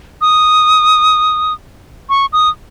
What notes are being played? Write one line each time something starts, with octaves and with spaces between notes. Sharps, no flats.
D#6
C#6
D#6